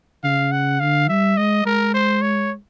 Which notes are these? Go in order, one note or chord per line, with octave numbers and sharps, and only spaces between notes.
C#3 F5
F#5
D3 F5
G3 E5
G#3 D#5
G#3 A#4
C5
C#5